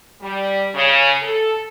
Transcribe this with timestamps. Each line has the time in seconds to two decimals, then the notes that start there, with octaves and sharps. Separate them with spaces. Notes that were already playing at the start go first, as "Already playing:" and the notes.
0.21 G3
0.74 C#3
1.23 A4